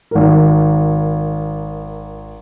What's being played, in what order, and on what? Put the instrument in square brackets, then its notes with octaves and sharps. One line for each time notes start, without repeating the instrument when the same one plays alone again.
[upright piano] G#1 A#4